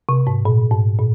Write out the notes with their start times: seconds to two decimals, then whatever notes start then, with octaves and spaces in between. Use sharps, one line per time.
0.09 C3
0.27 G#2
0.45 A#2
0.71 G#2
0.99 A#2